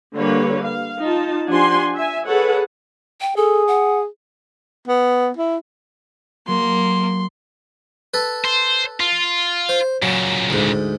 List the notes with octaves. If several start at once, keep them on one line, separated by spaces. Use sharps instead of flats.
D3 G3 A#3 B4 C#5
F5
D#4 F4 A5
F3 D4 G4 F#5 G#5 C6
E5 G#5
G#4 A4 B4 C#5 F#5
G5
G#4 A4
F#5
B3
E4
F#3 A#3 C6
A4 B4
C5
F4
C5
A#2 C#3 F#3
D2 G#2